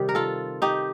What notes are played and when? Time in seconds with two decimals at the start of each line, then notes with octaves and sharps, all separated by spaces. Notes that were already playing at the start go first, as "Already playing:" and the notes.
Already playing: C3 D#3 G3 G4
0.09 A#4
0.15 F4 A4
0.62 D#4 G4